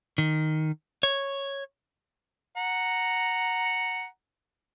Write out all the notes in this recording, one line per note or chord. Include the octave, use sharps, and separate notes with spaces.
D#3
C#5
F#5 A#5